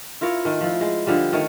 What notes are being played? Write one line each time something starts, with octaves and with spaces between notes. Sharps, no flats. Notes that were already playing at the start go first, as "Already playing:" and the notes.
E4 F4 A#4 C#5
D#3 A3
F3 E4
G#3
D3 F3 G3
D#3 A3 C#5